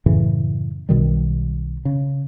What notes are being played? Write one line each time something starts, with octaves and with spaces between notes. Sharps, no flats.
F#2 A2 C#3 E3
B1 B2 D#3 G3
C#3